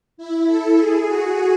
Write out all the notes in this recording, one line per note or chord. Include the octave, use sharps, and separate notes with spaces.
E4
A4
G#4
F#4